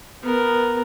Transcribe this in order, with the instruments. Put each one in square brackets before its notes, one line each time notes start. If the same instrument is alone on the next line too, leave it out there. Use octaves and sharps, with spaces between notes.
[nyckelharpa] B3 A#4